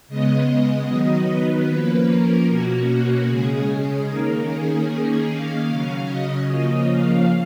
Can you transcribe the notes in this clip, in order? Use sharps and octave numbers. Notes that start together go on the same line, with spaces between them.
C#3 G#3 B3 D#5
D#3 F#3 B3
B4
F3 A#3 C#4
A#4
B2 A#3 C#4 F#4
F#4
C#3 G#3 C#4 G#4
D#3 A#3 C#4 A#4
G#4
D#3 A#3 C#4
F5
C#3 F#3 C#4
D#5
C#3 F3 A#3 C#4 D#5
F5